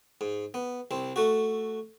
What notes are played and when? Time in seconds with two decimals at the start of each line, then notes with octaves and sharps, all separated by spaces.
0.21 G#2
0.54 B3
0.91 C2 C4
1.16 A3 F#4